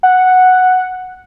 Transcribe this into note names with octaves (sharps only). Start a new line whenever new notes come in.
F#5